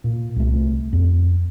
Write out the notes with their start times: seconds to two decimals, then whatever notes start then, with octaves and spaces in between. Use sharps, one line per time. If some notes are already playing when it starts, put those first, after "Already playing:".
0.04 A#2
0.36 C2 A3
0.93 F2